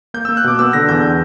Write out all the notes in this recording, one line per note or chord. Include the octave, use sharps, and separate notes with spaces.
A#3 G6
A#3 E6
F#6
B2 D6
B3 E6
D3 A#6
E2 G6